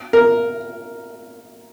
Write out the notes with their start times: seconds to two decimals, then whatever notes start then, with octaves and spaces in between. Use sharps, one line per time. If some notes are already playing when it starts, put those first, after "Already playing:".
0.13 A#4